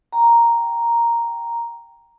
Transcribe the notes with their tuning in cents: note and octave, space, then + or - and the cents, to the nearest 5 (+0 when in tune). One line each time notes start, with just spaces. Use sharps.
G5 +0 A#5 +0